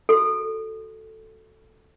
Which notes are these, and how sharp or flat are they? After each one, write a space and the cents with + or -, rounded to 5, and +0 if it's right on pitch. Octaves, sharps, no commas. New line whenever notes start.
F#4 +0 A4 +0